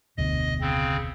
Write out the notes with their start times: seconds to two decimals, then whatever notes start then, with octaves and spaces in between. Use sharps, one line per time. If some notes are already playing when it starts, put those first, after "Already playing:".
0.17 F1 D2 B2 D#5
0.61 C#3 C4